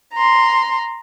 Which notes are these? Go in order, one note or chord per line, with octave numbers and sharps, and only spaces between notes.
A#5 C6